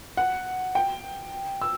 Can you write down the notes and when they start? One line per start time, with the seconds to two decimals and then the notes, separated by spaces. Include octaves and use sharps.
0.17 F#5
0.75 G5
1.62 E6